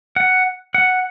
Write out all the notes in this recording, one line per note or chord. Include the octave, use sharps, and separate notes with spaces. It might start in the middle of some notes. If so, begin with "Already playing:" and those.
F#5
F#5